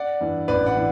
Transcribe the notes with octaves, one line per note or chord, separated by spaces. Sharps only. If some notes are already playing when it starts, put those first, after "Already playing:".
Already playing: D5 F#5
G2 E3
A1 B4 D5
D5 F#5
E3